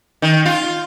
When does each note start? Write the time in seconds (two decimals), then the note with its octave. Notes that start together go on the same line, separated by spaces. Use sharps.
0.22 D#3
0.46 F4